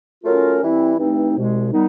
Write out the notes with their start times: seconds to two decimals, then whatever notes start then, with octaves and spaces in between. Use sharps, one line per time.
0.24 F#3 A3 C#4 F4 A#4
0.61 E3 G3 C4 E4
0.97 G2 E3 A3 C4 D#4
1.35 C2 B2 G#3
1.72 D#3 G3 B3 D#4